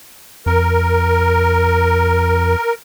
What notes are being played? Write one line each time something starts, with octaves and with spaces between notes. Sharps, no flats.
F2 A#4